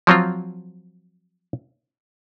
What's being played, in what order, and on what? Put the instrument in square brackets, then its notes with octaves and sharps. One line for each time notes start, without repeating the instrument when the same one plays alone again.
[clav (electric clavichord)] F3 F#3 C4 F4